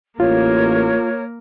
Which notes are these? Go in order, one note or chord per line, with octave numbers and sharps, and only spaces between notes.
A1 A#3 F4 A#4 C#5